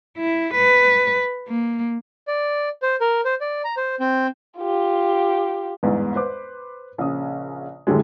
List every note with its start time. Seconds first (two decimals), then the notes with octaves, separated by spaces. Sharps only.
0.18 E4
0.55 B4
1.49 A#3
2.28 D5
2.82 C5
3.01 A#4
3.25 C5
3.41 D5
3.64 A#5
3.77 C5
4.00 C4
4.58 F4 G4
5.83 G1 E2 G#2
6.15 B4 C5 D6
6.98 A#1 C#3 D#6
7.87 F#2 A2 D3 G3 G#3